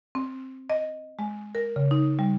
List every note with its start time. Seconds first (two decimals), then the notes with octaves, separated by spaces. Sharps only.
0.15 C4
0.70 D#5
1.19 G#3
1.55 A#4
1.76 C#3
1.91 D#4
2.19 G3